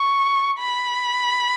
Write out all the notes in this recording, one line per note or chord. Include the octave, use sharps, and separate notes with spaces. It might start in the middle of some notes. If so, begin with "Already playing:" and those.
Already playing: C#6
B5